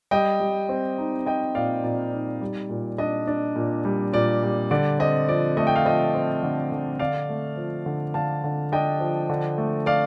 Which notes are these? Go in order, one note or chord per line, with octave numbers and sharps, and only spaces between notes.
G3 D#5 G5
G3
C4
D#4
C4 D#5 G5
A#2 D5 F5
A#2 D5
D#4
G3
A#2
D4 D#5
D4
A#2
G3
A#2 D5
G3
D3 D5
C4 D#5
F3 D5
A3 D#5
G5
F5
F3 D#5
C4
D3
D3
D3 D5 F5
A3
F3
D3
D3 F5 A5
D3
D4 D#5 G5
F3
D3
A3
D5 F5